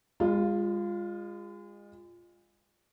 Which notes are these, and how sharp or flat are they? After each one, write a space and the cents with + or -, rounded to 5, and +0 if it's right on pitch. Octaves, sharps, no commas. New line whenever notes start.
G#3 -35 F4 +0